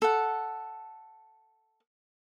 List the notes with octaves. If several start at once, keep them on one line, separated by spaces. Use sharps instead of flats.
A4 F#5